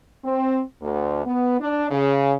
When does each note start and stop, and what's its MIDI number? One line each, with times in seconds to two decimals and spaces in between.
0.24 0.60 60
0.82 1.25 38
1.25 1.56 59
1.60 1.88 62
1.91 2.35 49